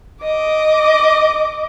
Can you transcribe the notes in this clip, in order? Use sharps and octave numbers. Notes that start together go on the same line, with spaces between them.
D#5 D6